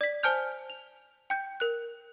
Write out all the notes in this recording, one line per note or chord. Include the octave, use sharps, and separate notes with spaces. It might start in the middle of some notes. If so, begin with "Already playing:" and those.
D5 B6
C5 G#5 A5 F6 G6 F7
F7
G5 G6
A#4 F#6